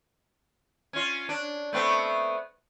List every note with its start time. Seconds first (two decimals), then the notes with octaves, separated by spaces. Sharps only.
0.93 C#4 F4
1.29 D4
1.73 A3 B3 C4